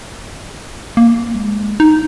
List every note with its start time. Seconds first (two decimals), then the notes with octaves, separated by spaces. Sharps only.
0.97 A#3
1.35 G3
1.38 G#3
1.80 D#4